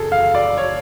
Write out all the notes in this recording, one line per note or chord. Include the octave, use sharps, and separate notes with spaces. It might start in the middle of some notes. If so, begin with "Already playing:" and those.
Already playing: F#2 C#3 G#4 A4
F5
D5
C#5